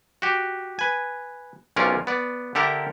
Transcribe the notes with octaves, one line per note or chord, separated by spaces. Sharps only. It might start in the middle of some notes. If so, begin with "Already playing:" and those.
F#4 G4
B4 G#5
B1 C3 C#4 F4 A#4 D5
B3 D5
D3 G4 A4 A#4 E5 A#5